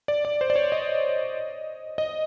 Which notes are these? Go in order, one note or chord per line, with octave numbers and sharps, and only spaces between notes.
D5
D5
C5
D5
C#5
D#5
D#5